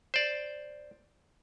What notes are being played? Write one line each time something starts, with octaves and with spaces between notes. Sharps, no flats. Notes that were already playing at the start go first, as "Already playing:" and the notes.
C5 D5